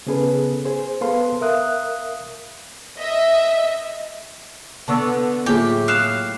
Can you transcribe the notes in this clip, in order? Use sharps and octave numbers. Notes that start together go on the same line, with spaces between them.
C#3 B3 C#4 G#4 A4 B4
G#4 C5
B3 A4 B4 F5 C6
A#4 E5 F5 D#6 F#6
D#5 E5
D3 B3 D4 A5 C#6 E6
A2 F#3 A#3 F4 G4 G#4
F5 D#6 F6 F#6 E7